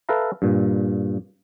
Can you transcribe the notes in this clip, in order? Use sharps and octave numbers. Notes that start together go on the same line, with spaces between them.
A4 B4 E5 F5 A#5
G2 A#2